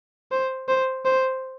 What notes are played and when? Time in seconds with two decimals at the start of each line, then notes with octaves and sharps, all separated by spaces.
0.32 C5
0.68 C5
1.05 C5